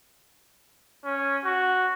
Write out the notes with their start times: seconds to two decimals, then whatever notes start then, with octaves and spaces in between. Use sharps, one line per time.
1.04 C#4
1.45 F#4